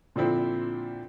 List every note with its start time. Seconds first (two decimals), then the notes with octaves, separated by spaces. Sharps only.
0.16 A#2 D3 F3 C4 E4